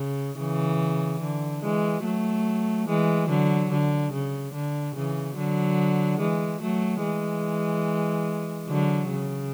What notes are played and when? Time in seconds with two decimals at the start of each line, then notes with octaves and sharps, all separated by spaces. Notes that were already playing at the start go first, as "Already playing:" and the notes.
Already playing: C#3
0.39 C#3 E3
1.21 D3
1.63 E3 G#3
2.04 F#3 A3
2.88 E3 G#3
3.29 D3 F#3
3.71 D3
4.12 C#3
4.53 D3
4.95 C#3 E3
5.37 D3 F#3
6.19 E3 G#3
6.61 F#3 A3
7.03 E3 G#3
8.69 D3 F#3
9.11 C#3